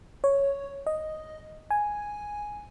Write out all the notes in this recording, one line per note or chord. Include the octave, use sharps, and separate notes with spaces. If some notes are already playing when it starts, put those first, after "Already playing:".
C#5
D#5
G#5